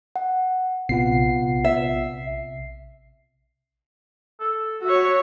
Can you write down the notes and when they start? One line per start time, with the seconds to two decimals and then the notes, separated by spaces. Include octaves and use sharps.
0.16 F#5
0.89 A#1 C3 B3 F4 F#5 C7
1.65 E5
4.40 A4
4.85 F#4 C#5 E5